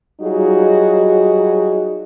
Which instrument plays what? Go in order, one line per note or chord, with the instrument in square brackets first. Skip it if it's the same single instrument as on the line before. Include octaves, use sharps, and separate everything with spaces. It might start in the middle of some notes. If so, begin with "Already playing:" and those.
[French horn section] F#3 G3 D#4 F4 F#4 G#4